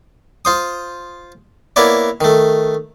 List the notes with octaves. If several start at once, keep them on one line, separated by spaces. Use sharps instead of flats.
F4 C5 D#6
A#3 B3 E4 C#5 D5
D#3 A3